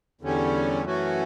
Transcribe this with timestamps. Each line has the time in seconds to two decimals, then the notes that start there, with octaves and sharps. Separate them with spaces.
0.21 E2 D3 G3 C#4
0.84 F#2 E3 A3 C#4 F#4